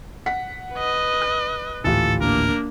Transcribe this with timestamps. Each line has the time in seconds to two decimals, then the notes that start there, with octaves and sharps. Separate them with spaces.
0.26 F#5 B6
0.74 B4 D#5
1.22 F#6
1.84 G#1 D2 A2 E3 F4 G4 A4
2.21 A#3 D4 A#4